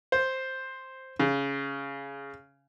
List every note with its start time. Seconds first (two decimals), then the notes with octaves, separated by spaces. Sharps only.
0.12 C5
1.19 C#3